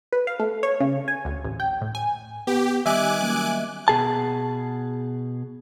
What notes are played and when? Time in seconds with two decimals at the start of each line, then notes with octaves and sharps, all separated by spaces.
0.12 B4
0.27 F5
0.39 A3
0.63 C#5
0.80 C#3
1.08 G#5
1.25 D2
1.44 A1
1.60 G5
1.81 A2
1.95 G#5
2.47 B3 G4
2.86 D#3 G3 B3 D#5 E5 G#5 D6 F#6
3.22 F#3 A#3 C#4
3.88 B2 G#4 A5